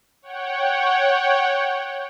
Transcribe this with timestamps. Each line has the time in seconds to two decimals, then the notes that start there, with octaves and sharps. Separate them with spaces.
0.22 C#5 F#5 G5